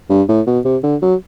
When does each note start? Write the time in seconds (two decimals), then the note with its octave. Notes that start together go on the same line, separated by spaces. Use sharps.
0.10 G2
0.29 A2
0.47 B2
0.65 C3
0.84 D3
1.02 F#3